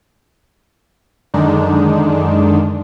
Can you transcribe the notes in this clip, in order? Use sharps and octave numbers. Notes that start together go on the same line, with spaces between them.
F#2 D3 D#3 G#3 D4 D#4